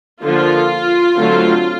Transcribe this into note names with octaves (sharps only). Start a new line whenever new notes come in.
D3 F3 A#3 F4
D3 F#3 A3 C4